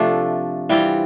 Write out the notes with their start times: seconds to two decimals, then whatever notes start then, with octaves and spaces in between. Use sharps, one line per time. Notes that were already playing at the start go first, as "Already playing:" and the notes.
Already playing: C3 F3 A3 D4
0.69 E3 G3 C4 F4